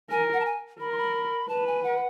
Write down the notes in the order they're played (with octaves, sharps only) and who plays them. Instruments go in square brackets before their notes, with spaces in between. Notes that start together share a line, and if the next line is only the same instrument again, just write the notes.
[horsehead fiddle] A#4 [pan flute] G#5
[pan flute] F#5
A5
G#5
[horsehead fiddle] A#4 [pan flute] B5
[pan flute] C6
B5
[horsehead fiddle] B4 [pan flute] A5
[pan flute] G#5
F#5